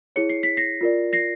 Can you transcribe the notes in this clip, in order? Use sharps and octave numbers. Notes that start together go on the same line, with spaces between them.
E4 G#4 C#5 C#7
C7
B6
A#6 C7
F4 A#4 D5
A#6 C7